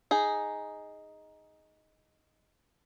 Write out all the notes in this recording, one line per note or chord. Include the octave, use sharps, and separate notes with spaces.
D#4 G#4